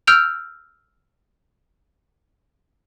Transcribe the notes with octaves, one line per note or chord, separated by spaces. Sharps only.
E6 F6 G6 D7 F7